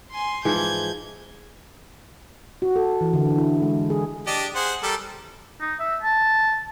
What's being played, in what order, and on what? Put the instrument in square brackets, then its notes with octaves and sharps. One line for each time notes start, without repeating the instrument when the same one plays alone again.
[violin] G#5 C6
[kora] G#2 E3 F3 [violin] G6 G#6
[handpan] F#4
A4
E3
D3
E4
G#3
G#4
[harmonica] D4 G4 D#5
G#4 C5 F#5
G3 A4 A#4
[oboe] D#4
E5
A5